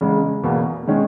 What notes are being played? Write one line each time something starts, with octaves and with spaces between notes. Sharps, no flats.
E2 C#3 G#3
E2 B2 A#3
D#3 G#3 C#4